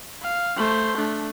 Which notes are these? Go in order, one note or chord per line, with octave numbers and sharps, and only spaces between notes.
F5
A3 C5
A3 D4